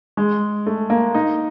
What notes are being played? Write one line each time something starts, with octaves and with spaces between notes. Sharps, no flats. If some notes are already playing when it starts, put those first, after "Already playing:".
G#3
A3
A#3
D#4